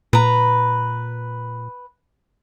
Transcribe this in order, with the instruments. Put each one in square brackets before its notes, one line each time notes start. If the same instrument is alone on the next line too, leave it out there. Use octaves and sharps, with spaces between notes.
[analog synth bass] A#2 [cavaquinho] B4 A#5